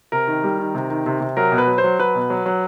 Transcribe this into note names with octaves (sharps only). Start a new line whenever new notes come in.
C3 A#4
D#3
G3
D#3
C3
D#3
C3
C3
F#3 A#4
B2
B4
F#3
C5
F#3
F#3 B4
B2
F#3
F#3